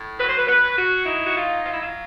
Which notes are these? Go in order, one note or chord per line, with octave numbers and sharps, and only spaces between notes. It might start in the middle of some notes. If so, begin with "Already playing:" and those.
Already playing: A2
F#3 B4
C5
B4
B4
F#3
F#4
D#4 E4
F#4
F4
F#3
F4
E4
F4